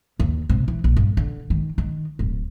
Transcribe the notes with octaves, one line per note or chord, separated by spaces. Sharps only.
D#2
C3
E3
A#1
G2
D3
D#3
D#3
D1